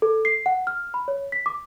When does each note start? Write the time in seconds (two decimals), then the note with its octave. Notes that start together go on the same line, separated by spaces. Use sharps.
0.02 A4
0.25 C7
0.46 F#5
0.67 F6
0.94 B5
1.08 C#5
1.32 B6
1.46 D6